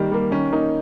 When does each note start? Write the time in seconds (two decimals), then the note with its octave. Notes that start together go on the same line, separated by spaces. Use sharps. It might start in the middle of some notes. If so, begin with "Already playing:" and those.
Already playing: D#3 G3 A#3
0.11 G3 A#3
0.31 D#3 C#4
0.52 A#3 D#4